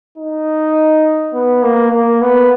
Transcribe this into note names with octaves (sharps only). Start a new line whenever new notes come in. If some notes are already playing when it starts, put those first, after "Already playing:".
D#4
B3
A#3
A#3
B3